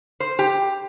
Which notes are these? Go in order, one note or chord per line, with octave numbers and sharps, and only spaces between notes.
C5
G4